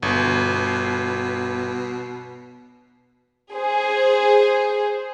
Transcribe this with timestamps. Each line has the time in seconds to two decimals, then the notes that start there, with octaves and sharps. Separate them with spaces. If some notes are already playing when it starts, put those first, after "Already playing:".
0.03 G1 B2
3.54 G#4 C5